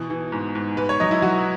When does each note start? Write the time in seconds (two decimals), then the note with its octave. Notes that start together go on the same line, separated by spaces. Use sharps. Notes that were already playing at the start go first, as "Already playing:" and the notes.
Already playing: B2 E3
0.10 E3
0.32 G#2
0.55 G#2
0.77 G#2 B4
0.89 C#5
1.00 F#3 D#5
1.11 E4
1.22 F#3 F#4